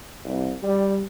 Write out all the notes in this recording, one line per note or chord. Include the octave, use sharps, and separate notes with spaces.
C2
G3